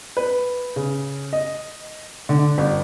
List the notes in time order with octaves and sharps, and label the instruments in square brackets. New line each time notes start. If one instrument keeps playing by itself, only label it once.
[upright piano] B4
C#3
D#5
D3
G1